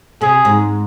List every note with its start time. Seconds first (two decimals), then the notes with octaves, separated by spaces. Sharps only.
0.21 C3 G#4
0.45 G#2